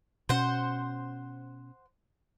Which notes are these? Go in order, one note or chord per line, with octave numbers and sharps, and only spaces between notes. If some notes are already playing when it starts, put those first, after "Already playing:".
B2 C#4 C5 F#5